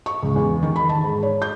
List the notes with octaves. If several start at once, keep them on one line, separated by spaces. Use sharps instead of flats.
C#6
C#2
E2
D#3
B5
A5
G#2
C#5
G6